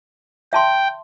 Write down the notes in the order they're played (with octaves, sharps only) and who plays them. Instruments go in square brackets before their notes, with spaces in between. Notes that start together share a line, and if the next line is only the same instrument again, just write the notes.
[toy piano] E5 A5 C6 [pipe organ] G5